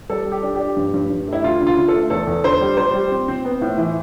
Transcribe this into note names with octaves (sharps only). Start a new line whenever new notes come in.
G3 A4
G3
G4
D4
D4 G4
G2
G2
G2
A3
E4
D2 F4
D3
F4
D3
A4
A3
E2 A4
E2
D3 C5
G3
G3 C5
G3
C4
C4
B3
A2
E3